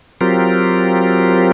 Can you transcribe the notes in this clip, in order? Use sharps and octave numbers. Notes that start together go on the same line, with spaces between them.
F#3 C4 F4 G4 A#4